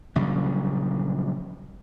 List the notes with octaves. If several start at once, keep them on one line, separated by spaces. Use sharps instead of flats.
A#1 C#3 F#3 G3